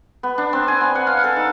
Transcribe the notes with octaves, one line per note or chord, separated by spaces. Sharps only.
B3
D4
C4
G#5
B3
F#5
F5
A4
D#4